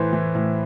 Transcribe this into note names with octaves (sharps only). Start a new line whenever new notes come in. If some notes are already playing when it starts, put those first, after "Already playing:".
Already playing: A2 E3 B4 C5
E3
A2